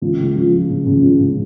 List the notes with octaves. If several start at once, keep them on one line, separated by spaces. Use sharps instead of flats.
C#2
C#3
F3
F3
C#3
C#3
C#2
C#3